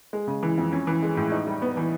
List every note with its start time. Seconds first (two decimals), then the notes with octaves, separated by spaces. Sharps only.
0.13 G#3
0.28 C#3
0.43 E3
0.58 F2
0.73 C#4
0.87 E3
1.03 G#3
1.17 A2
1.32 D#4
1.47 G3
1.62 B3
1.77 E3